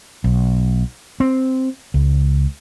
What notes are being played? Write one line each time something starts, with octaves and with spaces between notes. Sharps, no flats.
B1
C4
C#2